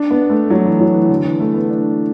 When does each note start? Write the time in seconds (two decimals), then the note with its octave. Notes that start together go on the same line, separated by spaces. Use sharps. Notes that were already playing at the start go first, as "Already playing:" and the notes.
Already playing: D4
0.10 B3
0.30 A3
0.50 F#3
0.65 E3
0.80 F#3
0.94 E3
1.09 D3
1.25 E3
1.40 A3
1.54 B3
1.70 D4